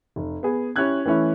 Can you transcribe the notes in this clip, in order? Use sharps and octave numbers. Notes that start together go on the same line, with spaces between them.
F1
B3 G#4
C#4 E4 G4 F#6 G#6
E3 A3 C#4 E4